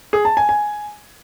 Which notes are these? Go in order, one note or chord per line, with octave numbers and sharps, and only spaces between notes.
G#4
A5
G#5
G#5